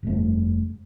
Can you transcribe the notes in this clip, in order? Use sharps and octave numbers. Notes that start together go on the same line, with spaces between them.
F1 G2 A3